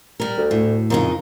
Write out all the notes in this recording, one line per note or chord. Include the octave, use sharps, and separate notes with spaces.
G3 A#4
D2
A2
F2 C#3 D#4 A#4